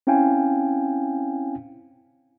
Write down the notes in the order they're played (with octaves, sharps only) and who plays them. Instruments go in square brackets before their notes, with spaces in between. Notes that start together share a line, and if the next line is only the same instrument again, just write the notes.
[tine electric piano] C4 C#4 E4 F5 G5 G#5